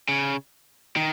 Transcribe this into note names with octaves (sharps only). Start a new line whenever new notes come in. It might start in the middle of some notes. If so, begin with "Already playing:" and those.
C#3
D#3